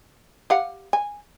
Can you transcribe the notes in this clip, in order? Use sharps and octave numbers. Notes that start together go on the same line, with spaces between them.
G4 F5 F#5
G#5